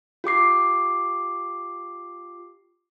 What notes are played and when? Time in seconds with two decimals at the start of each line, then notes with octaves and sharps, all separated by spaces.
0.24 F4 G4 D6 C7